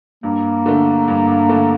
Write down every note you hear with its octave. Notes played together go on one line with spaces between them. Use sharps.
G2 A#3
D3 A3
G2
D3 A3